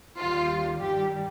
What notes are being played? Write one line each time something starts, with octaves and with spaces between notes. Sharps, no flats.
D#2 D#3 G3 F4
G2 D#3 G3 G4